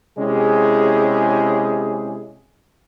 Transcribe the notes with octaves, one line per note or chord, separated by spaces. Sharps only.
C3 G#3 C#4 E4 G4 G#4